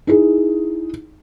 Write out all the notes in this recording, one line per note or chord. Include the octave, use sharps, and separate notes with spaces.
D#4 E4 G#4